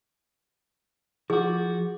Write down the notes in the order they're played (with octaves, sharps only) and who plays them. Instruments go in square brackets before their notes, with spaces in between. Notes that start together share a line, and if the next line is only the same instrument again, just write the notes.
[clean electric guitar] F3 F#4 [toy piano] G#4 D6